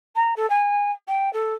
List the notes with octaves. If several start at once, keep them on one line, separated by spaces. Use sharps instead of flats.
A#5
A4
G#5
G5
A4